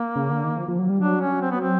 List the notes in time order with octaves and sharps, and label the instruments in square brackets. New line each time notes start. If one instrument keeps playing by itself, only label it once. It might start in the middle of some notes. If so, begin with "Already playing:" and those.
Already playing: [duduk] A#3
[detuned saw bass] C#3
D3
D#3
F3
F3
F#3
G3
[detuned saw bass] F#3 [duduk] D4
[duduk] C#4
C4
B3
C4